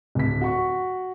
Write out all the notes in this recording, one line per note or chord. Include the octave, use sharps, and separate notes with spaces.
D1 B6
F#4 C#6